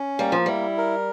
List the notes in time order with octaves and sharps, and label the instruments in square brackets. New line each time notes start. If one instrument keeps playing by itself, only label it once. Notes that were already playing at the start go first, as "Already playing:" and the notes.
Already playing: [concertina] C#4
[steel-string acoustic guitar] G3 [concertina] A#3
[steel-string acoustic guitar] F3
[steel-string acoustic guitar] G3 [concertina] E4
[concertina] A#4